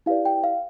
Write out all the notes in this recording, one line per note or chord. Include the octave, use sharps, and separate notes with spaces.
E4 G4 B4 D5 F5
G5
F5